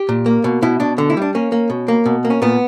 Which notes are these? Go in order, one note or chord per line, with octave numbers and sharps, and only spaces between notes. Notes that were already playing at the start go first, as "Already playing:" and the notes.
Already playing: G4
A#2
A#3
B2
B2 E4
B2 D4
D3
E4
G3 D4
A#3 C#4
A#3
B2
A#3
B2
A#3
C#4
A#2 B3